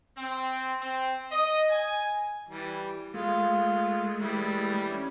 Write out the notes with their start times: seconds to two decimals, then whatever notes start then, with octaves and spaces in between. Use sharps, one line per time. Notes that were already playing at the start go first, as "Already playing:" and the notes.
0.18 C4
0.81 C4
1.32 D#5
1.71 G#5
2.49 E3 G3
3.14 G#3 A3 F4
4.21 E3 G3 E4
4.91 C#4